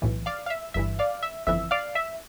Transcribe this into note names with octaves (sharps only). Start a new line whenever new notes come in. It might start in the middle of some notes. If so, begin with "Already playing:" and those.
B1 A2 E3
D5 F5
F5
E5
G1 G2 E3 E5
D5 F5
E5
G1 F2 E3 E5
D5 F5
E5